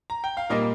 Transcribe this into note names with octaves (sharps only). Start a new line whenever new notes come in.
A#5
G5
F5
A#2 G3 A#3 A#4 D#5